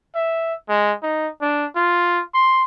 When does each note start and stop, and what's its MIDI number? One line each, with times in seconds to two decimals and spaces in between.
0.15 0.54 76
0.69 0.93 56
1.03 1.28 63
1.41 1.66 62
1.75 2.22 65
2.34 2.63 84